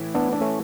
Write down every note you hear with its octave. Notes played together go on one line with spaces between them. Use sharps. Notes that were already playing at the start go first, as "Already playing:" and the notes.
Already playing: A2 E3 E4
B3 D4
D4
A3 C#4